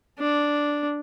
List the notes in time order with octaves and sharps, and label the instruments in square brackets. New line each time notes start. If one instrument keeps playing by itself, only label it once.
[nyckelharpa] D4